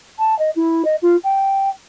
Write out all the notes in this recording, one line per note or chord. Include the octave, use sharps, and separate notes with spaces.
A5
D#5
E4
D#5
F4
G5